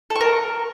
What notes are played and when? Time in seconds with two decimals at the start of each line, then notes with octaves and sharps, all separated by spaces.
0.10 A4
0.15 C#6
0.21 A#4